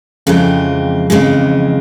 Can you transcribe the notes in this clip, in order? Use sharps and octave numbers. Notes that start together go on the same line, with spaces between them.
F2 C#3 E3 G#3 C4
F2 C#3 E3 G#3 C4